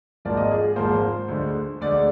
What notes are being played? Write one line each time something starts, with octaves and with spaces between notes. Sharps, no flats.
G#1 G#2 F3 A#3 D5
D#5
G#4
G#4
G#1 G#2 F3 A#3 C5
D2 D3 G#3
D2 D3 G#3 D5